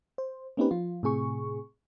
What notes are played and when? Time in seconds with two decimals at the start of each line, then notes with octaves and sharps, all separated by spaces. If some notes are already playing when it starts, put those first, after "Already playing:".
0.18 C5
0.57 A#3 C4 C#4 D#4 G4 B4
0.71 F3 F4
1.03 A2 C3 G#4 C#6